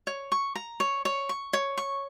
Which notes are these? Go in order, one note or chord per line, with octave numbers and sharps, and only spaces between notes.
C#5
C#6
A#5
C#5
C#5
C#6
C#5
C#6